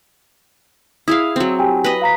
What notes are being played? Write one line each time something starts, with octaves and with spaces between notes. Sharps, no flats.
E4 G#4 F5 D#6
F#3 C4
G4 G5 G#5
B4 D#5
F5 A#5 B6